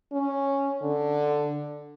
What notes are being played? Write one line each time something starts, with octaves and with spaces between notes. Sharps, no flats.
C#4
D3